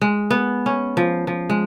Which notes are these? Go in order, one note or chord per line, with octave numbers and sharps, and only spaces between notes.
G#3
B3
C#4
F3
F3
G#3